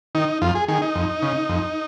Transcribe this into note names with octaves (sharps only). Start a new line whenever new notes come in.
D#3 D#4
F2 F4
G#4
D#3 G#4
D#4
F2
C#3
F2